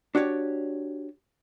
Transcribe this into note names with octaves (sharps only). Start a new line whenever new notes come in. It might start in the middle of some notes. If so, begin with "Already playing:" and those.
D4 F#4 G4 C#5 D5